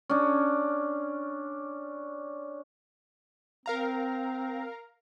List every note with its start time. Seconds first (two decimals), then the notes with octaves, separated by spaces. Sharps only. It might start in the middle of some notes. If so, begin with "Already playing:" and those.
0.09 C#4 D4
3.66 C4 A#4 F5 A#5